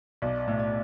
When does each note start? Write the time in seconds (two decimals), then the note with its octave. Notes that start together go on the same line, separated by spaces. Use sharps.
0.22 B1 D5
0.48 A2
0.59 D5